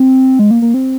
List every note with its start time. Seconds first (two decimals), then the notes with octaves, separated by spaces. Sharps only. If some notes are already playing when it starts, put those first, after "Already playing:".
Already playing: C4
0.39 G#3
0.51 A#3
0.62 A#3
0.74 C4